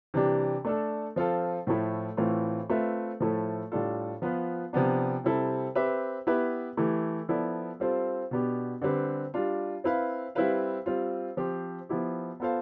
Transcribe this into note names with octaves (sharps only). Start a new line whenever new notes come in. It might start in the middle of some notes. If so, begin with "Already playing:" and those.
C3 E3 G3 D4 G4
A3 D4 A4
F3 C4 F4 A4
A2 F3 A3 E4
A2 E3 A3 C4 F4
A3 C4 F4 B4 E5
A2 F3 A3 E4 A4
A2 G3 D4 F4 A4
F3 B3 F4 B4
C3 F3 B3 D4
C3 G3 C4 E4 A4
C4 G4 B4 E5
B3 E4 G4 B4 E5
E3 A3 E4 G4
F3 B3 E4 A4 D5
G3 C4 F4 A4 C5
B2 B3 D4 G4
D3 G3 C4 G4 B4
G3 D4 F4
C4 E4 B4 F5
G3 C4 E4 B4 F5
G3 C4 F4
F3 C4 G4 C5
F3 B3 E4 G4
B3 F4 A4 C5 F5